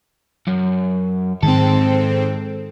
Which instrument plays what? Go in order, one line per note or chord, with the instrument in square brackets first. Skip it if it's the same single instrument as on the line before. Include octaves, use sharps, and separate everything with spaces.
[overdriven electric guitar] F#2
[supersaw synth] G#2 C4 [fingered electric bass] D#3 [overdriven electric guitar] A4